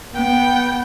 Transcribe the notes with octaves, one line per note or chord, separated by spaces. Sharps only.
B3 G5